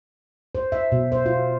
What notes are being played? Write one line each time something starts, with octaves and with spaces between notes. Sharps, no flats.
C5
E5
B2
C5
F4